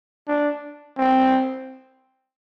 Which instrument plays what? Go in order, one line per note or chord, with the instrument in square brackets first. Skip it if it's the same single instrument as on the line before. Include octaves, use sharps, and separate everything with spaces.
[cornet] D4
C4